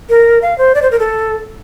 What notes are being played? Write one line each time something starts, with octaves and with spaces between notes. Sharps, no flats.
A#4
F5
C5
D5
C5
A#4
A4